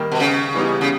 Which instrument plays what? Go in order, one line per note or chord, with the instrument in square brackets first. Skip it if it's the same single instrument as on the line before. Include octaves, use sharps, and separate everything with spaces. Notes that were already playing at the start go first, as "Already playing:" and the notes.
Already playing: [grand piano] D#3 G3 A#3
[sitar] B2
C#3
[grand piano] E3 G3 B3 D#4 G4
[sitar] C#3